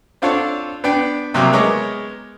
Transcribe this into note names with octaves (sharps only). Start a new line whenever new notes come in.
C4 D4 F4 A4 C#5
B3 D4 G5
C2 C3 F#3 A#3 D6
G#3 B3 A#4 C#5 D#5 D6